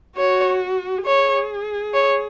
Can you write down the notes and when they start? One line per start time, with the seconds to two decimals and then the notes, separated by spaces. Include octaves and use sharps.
0.18 F#4 C#5
1.06 G#4 C#5
1.94 C#5